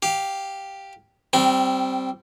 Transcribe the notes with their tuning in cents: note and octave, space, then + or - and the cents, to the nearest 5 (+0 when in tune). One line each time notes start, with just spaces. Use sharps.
G4 +0 F5 +0
G3 -15 C4 +0 G5 -30